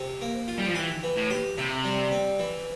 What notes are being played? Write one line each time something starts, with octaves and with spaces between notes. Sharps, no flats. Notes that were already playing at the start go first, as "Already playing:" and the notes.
Already playing: C3
A#3
F4
G3
F3
E3 G4
E3
A2
G4
C3 E4
G3
C4
E3